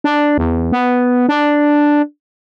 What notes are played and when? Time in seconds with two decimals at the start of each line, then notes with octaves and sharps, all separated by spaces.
0.04 D4
0.38 E2
0.72 B3
1.29 D4